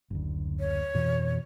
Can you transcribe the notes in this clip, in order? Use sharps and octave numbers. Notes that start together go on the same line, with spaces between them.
F#1 D2
C#5
F2 B2 E3